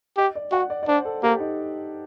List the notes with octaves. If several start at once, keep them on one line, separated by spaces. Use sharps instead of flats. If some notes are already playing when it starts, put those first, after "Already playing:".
G4 D#5
D5
F#4 F#5
D5
D5
D4 C5
A4
A#3 G4
D#4